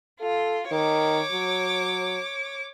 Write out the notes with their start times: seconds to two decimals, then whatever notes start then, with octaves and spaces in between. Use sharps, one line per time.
0.20 F4 A4
0.71 D#3 C#5 D6
1.32 F#3